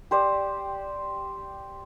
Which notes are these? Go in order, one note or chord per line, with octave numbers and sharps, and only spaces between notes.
G4 C5 D5